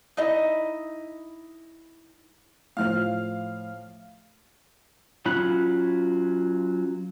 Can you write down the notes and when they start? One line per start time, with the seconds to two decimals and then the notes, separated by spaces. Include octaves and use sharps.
0.17 D#4 E4 D#5
2.77 A2 F3 C5 F5 F6
5.26 F#3 C#4 F4 B5 F#6